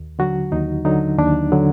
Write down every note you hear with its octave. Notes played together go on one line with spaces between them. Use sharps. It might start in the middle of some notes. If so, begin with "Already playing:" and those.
Already playing: D#2
D3 F#3 F#4
D#2 D#4
D3 F#3 D#4
D#2 D4
D3 F#3